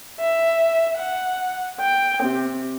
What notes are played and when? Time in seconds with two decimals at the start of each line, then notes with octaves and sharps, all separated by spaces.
0.19 E5
0.98 F#5
1.78 G5
2.23 C3